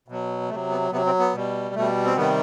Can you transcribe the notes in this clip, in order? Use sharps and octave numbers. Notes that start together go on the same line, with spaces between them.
B2 F#3
C3 F#3 A3
B3
C3 F#3 B3
C3 C4
B3
B2 G3
B2 G3 A3
C4
C3 D#3 G3 B3